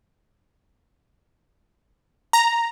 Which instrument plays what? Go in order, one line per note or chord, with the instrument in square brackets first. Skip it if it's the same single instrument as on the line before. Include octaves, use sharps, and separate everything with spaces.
[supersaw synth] A#5